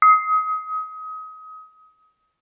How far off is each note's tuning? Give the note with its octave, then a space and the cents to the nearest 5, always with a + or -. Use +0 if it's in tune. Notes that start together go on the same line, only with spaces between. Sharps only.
D#6 +30